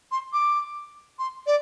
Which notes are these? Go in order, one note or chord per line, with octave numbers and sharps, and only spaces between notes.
C6
D6
C6
D5